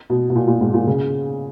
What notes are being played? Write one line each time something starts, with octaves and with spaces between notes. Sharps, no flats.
B2
B2
A#2
A#2
G#2
A#2
C#3